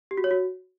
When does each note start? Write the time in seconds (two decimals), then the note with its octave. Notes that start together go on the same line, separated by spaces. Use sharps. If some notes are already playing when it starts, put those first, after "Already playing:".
0.11 G4
0.17 F#4
0.24 C#5
0.31 F#4